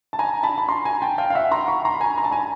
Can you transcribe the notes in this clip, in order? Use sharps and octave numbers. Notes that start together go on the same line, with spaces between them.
A5
G#5 A#5
A5 B5
B5
A#5 C6
G#5 A#5
G5 A5
F5 G5
F5
E5 F#5
A#5 C6
B5 C#6
A#5 C6
B5
G#5 A#5
A#5
A5
G#5 A#5